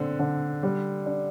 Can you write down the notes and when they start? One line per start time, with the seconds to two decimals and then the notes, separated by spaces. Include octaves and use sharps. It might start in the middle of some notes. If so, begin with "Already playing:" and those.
Already playing: D3 C4
0.19 D3
0.63 G3
1.06 D4